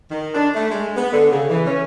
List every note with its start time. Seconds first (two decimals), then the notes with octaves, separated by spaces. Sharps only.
0.10 D#3
0.34 D4
0.54 A3
0.71 G#3
0.97 B3
1.12 D3
1.31 C#3
1.49 E3
1.65 C#4